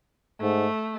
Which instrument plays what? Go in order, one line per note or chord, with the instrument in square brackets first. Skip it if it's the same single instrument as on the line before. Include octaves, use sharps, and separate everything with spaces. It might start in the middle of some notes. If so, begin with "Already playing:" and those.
[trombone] G#2 [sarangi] A3